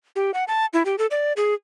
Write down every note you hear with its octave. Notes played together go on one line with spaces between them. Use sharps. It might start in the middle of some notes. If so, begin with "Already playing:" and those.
G4
F#5
A5
E4
G4
A4
D5
G#4